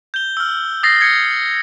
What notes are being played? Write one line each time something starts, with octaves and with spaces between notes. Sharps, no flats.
G6 G7
E6 F6
D#6 A6 A#6 C7
G#6 C#7